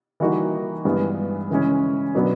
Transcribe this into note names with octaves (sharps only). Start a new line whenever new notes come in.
E3 G3 A#3 D#4 F#4
G2 E3 G#3 B3
C#3 E3 G#3 C#4
B2 F#3 B3 D4